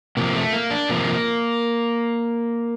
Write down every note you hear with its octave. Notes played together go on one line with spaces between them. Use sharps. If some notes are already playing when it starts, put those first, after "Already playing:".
C3 F3 A#3
A3
A#3
D4
C3 F3 A#3